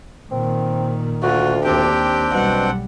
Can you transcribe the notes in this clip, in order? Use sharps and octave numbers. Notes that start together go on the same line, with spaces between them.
A#2 D#3 C4
D2 F4 F#4
D#2 C4 D4 G4 G5
B1 B2 G3 F#5